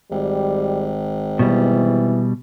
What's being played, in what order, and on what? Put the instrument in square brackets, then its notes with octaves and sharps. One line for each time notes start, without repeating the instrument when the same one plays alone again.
[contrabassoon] G#1 [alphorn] G3
[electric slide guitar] B2 G3 [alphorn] E3